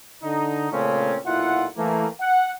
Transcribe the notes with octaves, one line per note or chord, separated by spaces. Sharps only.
D3 D#4
A#2 C#3 A3 C4 C#4
B1 A#2 E4 F4 E5 F#5
E3 A3 A#3
F#5